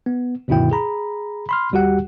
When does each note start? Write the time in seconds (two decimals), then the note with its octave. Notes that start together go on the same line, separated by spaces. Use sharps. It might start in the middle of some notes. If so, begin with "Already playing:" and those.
0.06 B3
0.48 D2 G2 B2 D#3 E4 G5
0.71 G#4 A#5 B5
1.49 B5 C6 F6
1.71 G1 D#2 G3 F#4 G4 F#5